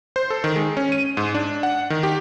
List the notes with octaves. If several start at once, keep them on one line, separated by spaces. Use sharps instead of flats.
C5
A4
D#3
G#3
C#4
D#7
G#2
D4
F#5
D#3
G4